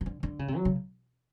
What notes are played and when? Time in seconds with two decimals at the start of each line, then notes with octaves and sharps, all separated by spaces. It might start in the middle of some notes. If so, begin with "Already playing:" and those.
0.01 D#3
0.06 D3
0.23 D3
0.39 C#3
0.48 C3
0.56 F#3
0.65 C#3